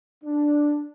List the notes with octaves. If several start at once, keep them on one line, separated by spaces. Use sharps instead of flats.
D4